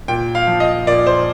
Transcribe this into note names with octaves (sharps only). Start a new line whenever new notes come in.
A#2 G5
F5
F3
D#5
A#2 D5
C5